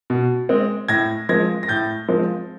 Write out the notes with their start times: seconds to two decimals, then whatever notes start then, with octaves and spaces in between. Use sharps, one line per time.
0.10 B2
0.49 G#3 C4
0.88 A2 G#6 A#6
1.29 F3 G#3 C4 G#6 A#6
1.63 A#6
1.68 A2 G6 A6
2.09 F3 G#3 C4